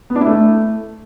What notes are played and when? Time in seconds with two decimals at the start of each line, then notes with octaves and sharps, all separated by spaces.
0.10 B3
0.16 D4
0.21 E4
0.27 A3